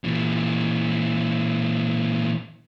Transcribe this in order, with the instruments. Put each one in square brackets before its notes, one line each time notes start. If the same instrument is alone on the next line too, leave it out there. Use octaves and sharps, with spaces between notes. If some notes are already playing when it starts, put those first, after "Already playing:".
[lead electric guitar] A#2 E3